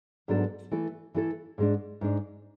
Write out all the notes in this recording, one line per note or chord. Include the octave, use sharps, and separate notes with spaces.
G#2 F#3 B3 D4 A4
E3 A3 E4 A4
E3 A3 E4 A4
G#2 G#3 D4
G#2 G#3 D4